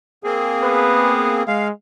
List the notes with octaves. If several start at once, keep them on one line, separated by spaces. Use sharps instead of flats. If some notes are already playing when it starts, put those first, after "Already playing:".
A#3 C4 G#4
B3 B4
G#3 F5